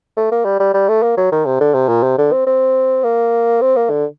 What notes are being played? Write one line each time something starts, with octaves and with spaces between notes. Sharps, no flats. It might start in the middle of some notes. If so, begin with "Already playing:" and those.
A3
A#3
G3
G3
G3
A3
A#3
F#3
D#3
C3
D3
C3
A#2
C3
D3
C4
C4
A#3
C4
A#3
D3